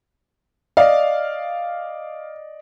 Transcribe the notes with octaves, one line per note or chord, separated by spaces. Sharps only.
D5 D#5 F5